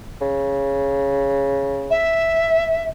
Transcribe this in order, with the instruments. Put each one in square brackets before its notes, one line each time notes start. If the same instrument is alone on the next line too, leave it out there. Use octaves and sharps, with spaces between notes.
[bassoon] C#3
[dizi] E5